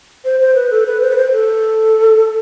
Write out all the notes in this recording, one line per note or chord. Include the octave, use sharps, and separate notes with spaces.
C5
C5
B4
A4
B4
C5
B4
C5
A4